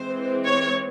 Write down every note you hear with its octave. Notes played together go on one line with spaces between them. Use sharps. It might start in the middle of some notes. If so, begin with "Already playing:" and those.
Already playing: E3 G#3 C4 C5
C#5